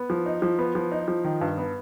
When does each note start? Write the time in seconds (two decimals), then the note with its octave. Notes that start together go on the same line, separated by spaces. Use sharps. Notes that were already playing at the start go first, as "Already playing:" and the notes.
Already playing: B3
0.10 F3
0.26 D#4
0.42 F3
0.59 B3
0.75 F3
0.92 D#4
1.08 F3
1.24 D#3
1.41 G2
1.58 B3